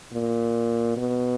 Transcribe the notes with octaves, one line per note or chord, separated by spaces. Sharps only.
A#2
B2